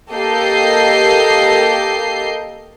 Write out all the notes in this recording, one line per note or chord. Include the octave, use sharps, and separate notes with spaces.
A#3 G4 A4 D#5 G6 C7